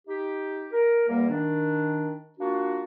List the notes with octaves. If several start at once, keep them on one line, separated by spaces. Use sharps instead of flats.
D#4 G4
A#4
E2 G3 A#3
D#3 D4
A#3 D4 F4 F#4